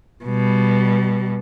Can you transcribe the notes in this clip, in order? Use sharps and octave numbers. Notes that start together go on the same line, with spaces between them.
B2 G3